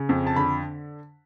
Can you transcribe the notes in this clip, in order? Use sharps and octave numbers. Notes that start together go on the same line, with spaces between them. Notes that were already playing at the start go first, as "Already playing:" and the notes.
Already playing: C#3
F2
A5
D3 B5